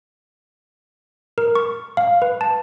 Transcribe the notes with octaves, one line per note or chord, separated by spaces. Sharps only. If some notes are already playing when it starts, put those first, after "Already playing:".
A#4
C#6
F5
B4
A5